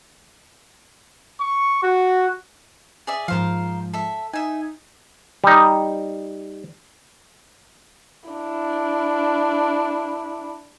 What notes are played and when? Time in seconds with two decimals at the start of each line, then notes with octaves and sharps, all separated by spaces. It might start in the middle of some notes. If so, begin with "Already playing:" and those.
1.39 C#6
1.82 F#4
3.07 G#4 D5 E5
3.28 G#2 F3 A#4 C5 F5
3.94 A4 E5
4.33 D#4 E5 G#5
5.44 G3 D#4
8.30 D4 E4